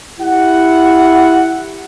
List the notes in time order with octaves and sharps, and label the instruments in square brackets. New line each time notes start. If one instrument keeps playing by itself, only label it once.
[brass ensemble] E4 G4 F#5